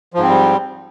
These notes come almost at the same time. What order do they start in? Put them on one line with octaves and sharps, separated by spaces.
F3 G#2 C4 G3